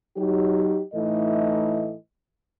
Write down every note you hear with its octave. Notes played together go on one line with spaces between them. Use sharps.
F#3 D#4 G4
A2 E3 A3 D#4 A4 D#5